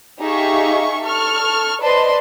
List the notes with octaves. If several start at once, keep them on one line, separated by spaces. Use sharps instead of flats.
D#4 G4 G#4 E5 F5 C#6
A4 C#6 F6
B4 C5 D5 D#5 A5 C6